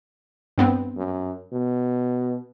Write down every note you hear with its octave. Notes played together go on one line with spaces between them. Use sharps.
G2 B3 C4
F#2
B2